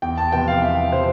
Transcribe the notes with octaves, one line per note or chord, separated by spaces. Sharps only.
E2 G5
A5
C3 F3 B3 G5
F5
E2 E5
C3 F3 B3 C5